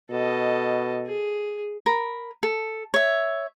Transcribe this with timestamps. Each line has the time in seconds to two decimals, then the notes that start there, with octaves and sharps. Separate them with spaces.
0.11 B2 A4 D#5
1.06 G#4
1.86 A#4 B5
2.43 A4
2.94 C#5 E5